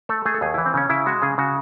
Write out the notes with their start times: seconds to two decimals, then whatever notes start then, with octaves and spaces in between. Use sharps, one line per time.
0.09 A3 A4
0.25 A3 G#4
0.34 A4
0.41 D#2 G#4
0.54 E3 E4
0.66 C4
0.74 C#3 C#4
0.89 C#3 E4
1.06 G#3 F#4
1.22 C#3 G#4
1.38 C#3 F#4